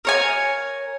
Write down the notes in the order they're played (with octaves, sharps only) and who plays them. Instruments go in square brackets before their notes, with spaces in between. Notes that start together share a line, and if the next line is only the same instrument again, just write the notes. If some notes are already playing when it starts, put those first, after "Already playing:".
[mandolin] A#4 C#5 G#5